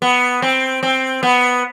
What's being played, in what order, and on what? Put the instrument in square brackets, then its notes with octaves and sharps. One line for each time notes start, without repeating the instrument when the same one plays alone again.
[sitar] B3
C4
C4
B3